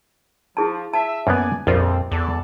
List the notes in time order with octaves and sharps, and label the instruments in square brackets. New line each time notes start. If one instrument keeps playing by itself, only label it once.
[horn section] F3 [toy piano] E4 G#4 A5
[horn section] E5 [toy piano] A5
[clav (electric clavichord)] F#2 A#3 B3 [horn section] D5 G#5
[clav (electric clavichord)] A#1 F4 [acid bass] F2 [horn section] E3 G3 C4
[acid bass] E2 [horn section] A4 D5 A5